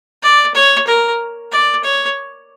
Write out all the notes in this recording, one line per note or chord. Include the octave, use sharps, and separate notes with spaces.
D5
C#5
A#4
D5
C#5